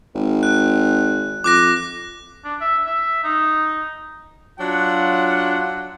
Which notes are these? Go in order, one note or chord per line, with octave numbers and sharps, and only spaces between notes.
G#1
F#6
F2 D6 F#6 A#6
D4
E5
E5
D#4
F#3 D4 F4 F#5